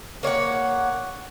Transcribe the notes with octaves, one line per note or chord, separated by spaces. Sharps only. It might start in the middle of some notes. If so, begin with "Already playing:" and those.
A#3 C#5 F5 F#5